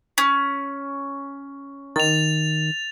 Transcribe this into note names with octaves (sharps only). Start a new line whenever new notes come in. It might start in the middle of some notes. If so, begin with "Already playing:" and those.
C#4
D#3 A6 F7